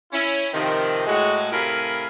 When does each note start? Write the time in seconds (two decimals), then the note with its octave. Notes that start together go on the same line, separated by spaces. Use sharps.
0.12 C#4 E4
0.53 C3 D#3 F3
1.06 A2 G#3 F#4
1.52 A2 C3 A#4 F5 G#5 B5